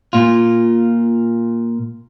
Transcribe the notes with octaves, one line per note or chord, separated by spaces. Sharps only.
A#2 F4